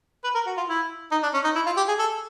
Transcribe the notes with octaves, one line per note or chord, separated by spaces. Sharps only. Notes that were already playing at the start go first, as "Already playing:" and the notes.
B4
A#4
F#4
F4
E4
D#4
D4
C#4
D#4
E4
F4
G4
G#4
A4